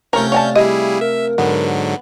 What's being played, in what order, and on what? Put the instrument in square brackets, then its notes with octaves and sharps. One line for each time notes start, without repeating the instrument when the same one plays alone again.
[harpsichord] C3 A3 F4 [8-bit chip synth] C#4 G6 [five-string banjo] A#4 C#5
[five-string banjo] C#5 G#5 A5 [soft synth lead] D5
[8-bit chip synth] G3 E4 G#4 [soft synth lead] G4 [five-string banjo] D#5
[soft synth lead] A#4 [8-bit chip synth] E5
[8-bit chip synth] G#2 D3 F#3 [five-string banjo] B3